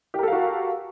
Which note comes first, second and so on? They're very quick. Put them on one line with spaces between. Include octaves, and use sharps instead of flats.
G4 A#4 A4 F5 F#4